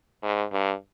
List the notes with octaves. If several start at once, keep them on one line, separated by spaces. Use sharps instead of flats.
G#2
G2